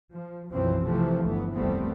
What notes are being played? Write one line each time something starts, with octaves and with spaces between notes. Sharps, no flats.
F3
B1 F#2 B2 E3 F3 C4
C3 E3 F3 A3 C4
G1 D2 E3 B3
F1 C2 G3 A3 B3 C4